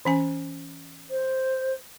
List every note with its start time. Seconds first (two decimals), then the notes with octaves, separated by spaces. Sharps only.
0.05 E3 C#4 G#5
1.10 C5